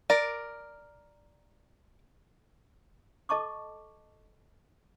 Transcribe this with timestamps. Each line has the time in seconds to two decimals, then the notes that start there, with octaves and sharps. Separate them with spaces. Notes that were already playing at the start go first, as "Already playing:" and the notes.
0.10 A#4 D5
3.29 A4 D#5 A5 C#6 D6